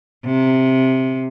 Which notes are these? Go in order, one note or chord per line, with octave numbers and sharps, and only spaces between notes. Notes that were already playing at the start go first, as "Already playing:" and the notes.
C3